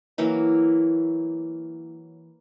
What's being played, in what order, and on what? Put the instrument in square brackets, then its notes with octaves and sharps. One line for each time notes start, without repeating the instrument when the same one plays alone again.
[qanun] E3 F#3 A#3 E4